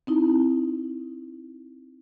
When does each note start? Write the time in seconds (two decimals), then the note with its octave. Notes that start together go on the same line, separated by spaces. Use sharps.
0.07 C4 D#4 E4